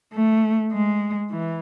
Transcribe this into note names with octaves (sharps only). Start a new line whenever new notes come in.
A3
G#3
E3